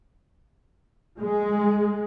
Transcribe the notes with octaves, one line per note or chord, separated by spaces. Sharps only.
G#3